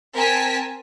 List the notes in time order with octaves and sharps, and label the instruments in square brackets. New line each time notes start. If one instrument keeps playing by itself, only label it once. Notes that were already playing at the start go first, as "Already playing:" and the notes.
[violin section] C4 A#4 G#5 A5 B6